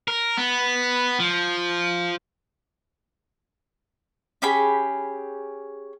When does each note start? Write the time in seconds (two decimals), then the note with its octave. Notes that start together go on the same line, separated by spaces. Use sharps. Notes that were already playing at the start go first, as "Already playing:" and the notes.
0.08 A#4
0.38 B3
1.20 F3
4.42 C#4 G4 G#4 B5